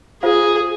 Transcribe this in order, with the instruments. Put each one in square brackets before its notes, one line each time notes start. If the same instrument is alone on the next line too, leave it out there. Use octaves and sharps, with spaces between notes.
[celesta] F4 C5 F5 [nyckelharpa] G#4